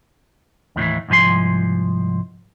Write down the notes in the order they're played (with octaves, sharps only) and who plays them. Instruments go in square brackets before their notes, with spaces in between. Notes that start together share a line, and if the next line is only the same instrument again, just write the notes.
[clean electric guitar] D#2 A2 D3 E3
C2 G#2 F3 G#5 C6